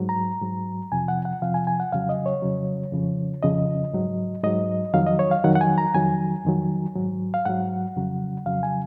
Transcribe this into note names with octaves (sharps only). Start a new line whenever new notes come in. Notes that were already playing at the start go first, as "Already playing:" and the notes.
Already playing: G#2 F#3
A#5
G#2 F#3
F2 C3 F3 G#5
F#5
F#5
F2 C3 F3 F5
G#5
G#5
F#5
F2 C#3 F#3 F5
D#5
C#5
F2 C#3 F#3
F2 C#3 F3
F2 C#3 F3 D#5
G#2 F#3
G#2 F#3 D#5
F2 D#3 F#3 F5
D#5
C#5
F5
F2 D#3 F#3 F#5
F#5
G#5
A#5
F2 D#3 F#3 G#5
F2 D#3 F#3
G#2 F#3
F5
G#2 F#3 F#5
F2 C#3 F#3
F2 C#3 F#3 F5
G#5